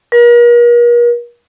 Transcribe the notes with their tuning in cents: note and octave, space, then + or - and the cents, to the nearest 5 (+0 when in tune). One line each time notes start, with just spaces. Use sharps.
A#4 +40